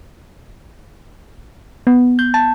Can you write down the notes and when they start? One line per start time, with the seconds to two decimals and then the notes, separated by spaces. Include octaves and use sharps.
1.87 B3
2.19 G6
2.34 A5